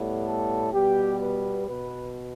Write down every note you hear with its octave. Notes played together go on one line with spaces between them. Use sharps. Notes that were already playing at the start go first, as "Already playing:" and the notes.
Already playing: A2 G3 B3
A4
B2 G3 B3 G4
B4
B2 B3 B4